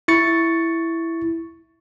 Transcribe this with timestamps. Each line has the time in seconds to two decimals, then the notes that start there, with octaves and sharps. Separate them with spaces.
0.08 E4 C#6 A6 C#7